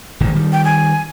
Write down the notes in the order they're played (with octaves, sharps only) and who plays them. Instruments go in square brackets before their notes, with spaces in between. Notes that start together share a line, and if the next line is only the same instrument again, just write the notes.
[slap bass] G#1 A#2 D3
D#3 G3
[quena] G5
G#5